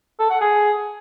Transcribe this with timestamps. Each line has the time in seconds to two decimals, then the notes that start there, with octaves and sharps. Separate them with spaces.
0.19 A4
0.30 F#5
0.41 G#4